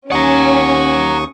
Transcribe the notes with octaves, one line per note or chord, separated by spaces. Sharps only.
D#2 C#4 F#5 A#5 C#6 D#6